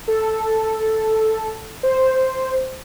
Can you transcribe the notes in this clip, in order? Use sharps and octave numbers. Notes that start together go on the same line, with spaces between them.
A4
C5